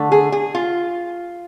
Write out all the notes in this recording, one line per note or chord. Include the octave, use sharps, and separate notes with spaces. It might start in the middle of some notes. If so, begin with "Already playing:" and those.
Already playing: D3 A3
G#4
G#4
F4